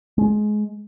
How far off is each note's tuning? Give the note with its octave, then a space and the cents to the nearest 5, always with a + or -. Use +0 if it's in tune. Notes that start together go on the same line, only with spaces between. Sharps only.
G#3 +20